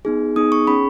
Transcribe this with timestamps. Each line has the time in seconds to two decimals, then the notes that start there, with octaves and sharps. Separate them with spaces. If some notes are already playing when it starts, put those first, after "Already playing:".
0.05 B3 D#4 G#4
0.36 B3 D#4 G#4 D#6
0.52 C#6
0.67 C#4 G#4 B5